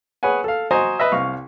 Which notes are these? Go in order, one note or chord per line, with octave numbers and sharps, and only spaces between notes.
G#4 B4 C#5 F#5 G#5
A4 F5
F#4 C5 D#5 G#5 A#5 D#6
B4 D#5 E5
C2 F5 C#6